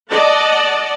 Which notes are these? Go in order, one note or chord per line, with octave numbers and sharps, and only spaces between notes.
D5 D#5 F#5 A5